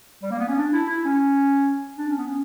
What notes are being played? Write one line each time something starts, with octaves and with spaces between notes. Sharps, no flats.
G3
A#3
B3
C#4
D4
E4
E4
C#4
D4
C#4
B3
C#4